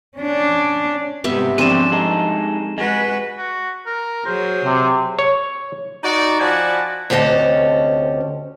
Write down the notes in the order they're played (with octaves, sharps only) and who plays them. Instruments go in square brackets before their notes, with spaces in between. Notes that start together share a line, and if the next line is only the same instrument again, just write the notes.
[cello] C#4 D4
[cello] G#2 C3 [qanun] G3 B3 E5
[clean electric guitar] E2 C#3 G3 [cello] F3 [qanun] C4 D4 [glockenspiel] D#7 E7
[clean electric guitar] G#3 D#4 A4
[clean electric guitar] G#3 [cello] F#4 B4
[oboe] F#4
A#4
[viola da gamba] F#3 G#4 [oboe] C5
[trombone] C3
[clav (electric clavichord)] C#5
[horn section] D#4 F#4 D5
F3 F#4 D5 G#5 A5 B5
[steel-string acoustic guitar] D2 C3 C#4 G#4 D#5 A5